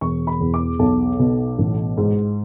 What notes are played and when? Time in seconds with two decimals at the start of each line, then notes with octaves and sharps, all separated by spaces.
0.01 E1 C#6
0.27 B5
0.40 E2
0.54 D6
0.79 B1 A5
1.19 B2
1.59 A1
1.97 G#2